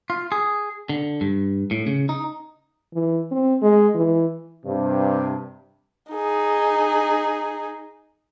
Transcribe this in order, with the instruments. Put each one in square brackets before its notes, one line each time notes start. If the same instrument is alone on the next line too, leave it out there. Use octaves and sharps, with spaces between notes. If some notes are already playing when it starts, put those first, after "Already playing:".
[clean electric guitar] F4
G#4
D3
G2
A2
C#3
D#4
[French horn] E3
C4
G#3
E3
[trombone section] G2 C3
[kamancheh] D#4 G#4